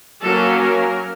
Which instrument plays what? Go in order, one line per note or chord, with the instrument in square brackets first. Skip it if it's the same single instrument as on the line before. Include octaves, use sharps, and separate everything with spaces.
[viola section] F#3 A#3 C#4 A4
A#4